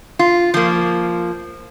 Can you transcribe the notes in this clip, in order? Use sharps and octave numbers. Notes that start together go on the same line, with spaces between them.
F4
F3 A#3